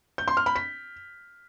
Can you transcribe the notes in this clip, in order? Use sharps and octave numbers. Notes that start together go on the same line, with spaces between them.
G6
C6
F6
B5
B6